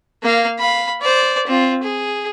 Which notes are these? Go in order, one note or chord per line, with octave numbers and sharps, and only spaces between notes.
A#3 F5
F5 B5
C5 D5
C4 F4
G#4